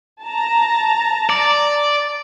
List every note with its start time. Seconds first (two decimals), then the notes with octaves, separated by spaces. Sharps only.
0.23 A5 A#5
1.30 D5